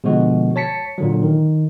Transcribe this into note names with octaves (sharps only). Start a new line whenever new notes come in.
B2 D3 F3 G#3 F#4
C#5 A5 B6 C#7
A#2 D3 F#3
D#3